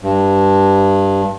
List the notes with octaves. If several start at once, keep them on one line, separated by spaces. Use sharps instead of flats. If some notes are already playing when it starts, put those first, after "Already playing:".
G2